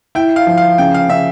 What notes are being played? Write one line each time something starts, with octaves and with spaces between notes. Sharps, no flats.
E4 G5
F5
F3
F5
C#3 G5
F5
C#3 E5